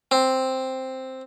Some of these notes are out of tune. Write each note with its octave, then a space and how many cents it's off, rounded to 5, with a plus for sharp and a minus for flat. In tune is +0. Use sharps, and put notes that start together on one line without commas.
C4 +0